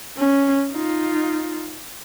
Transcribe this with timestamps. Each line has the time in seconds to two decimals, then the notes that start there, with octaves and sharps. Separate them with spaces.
0.17 C#4
0.71 D#4 F4